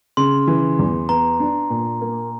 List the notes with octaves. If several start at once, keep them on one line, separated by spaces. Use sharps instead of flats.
C#3 C6
E3
E2
B3 A#5
D4
A#2
A#3